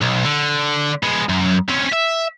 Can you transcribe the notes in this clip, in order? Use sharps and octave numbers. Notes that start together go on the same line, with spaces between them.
B1
D3
G#3 B3
F#2
C4 C#4
E5